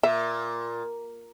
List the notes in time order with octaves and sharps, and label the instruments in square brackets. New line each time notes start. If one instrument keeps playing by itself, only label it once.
[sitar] A#2 [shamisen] E5